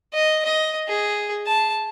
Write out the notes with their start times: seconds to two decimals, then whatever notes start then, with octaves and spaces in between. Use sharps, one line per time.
0.13 D#5
0.45 D#5
0.88 G#4
1.47 A5